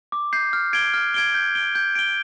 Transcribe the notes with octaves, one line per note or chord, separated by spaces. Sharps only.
D6
G6 C7
F6
G#6 D7 G7
F6
G#6 D7 G7
G6
D7 G7
G6
D7 G7